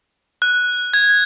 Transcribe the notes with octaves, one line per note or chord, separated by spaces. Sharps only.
F#6
G#6